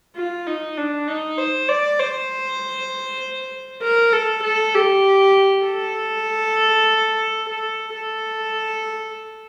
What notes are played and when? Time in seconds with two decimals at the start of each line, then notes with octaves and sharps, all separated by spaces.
0.16 F4
0.47 D#4
0.77 D4
1.07 D#4
1.38 C5
1.69 D5
1.99 C5
3.83 A#4
4.13 A4
4.43 A4
4.75 G4
5.65 A4
7.49 A4
7.94 A4